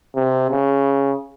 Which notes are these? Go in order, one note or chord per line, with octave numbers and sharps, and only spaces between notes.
C3
C#3